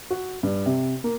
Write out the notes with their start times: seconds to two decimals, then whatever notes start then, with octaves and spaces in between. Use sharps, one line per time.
0.10 F#4
0.43 G2
0.66 C3
1.04 A#3